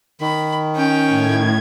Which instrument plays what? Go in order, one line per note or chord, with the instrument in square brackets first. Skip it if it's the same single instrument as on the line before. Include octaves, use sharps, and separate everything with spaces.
[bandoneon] D#3 [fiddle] B5
[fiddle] C#4 G5
[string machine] A2 G#6